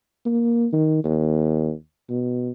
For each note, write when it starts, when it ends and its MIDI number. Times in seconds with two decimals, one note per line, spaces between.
0.26 0.66 58
0.73 1.00 51
1.04 1.72 39
2.10 2.50 47